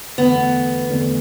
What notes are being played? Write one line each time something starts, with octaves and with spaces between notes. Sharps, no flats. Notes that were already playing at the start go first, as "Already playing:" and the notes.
E2 D3 A3 B3
E2 D3 A3